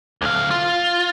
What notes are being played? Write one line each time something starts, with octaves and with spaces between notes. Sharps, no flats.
D2 F5
F4